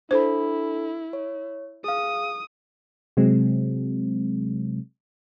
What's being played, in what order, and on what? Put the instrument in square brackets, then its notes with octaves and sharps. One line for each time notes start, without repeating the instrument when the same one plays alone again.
[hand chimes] D4 A4 B5 [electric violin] E4 [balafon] C5
[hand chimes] C#5
[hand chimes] G#4 F5 [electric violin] D#6
[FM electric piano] C3 F#3 G#3 C4